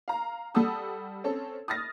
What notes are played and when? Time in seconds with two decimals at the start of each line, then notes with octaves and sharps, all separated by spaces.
0.08 F5 A#5
0.55 G3 A4 F#5 A5 D#6 E6
1.24 C4 C#4 A4
1.68 D#6 F6 A6 A#6